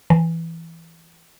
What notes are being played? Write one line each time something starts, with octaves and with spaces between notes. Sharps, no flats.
E3